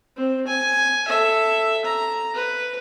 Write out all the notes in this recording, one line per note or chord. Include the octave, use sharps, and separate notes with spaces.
C4
G#5
A4 E5
A#5
B4